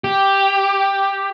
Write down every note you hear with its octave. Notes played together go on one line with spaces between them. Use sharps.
G4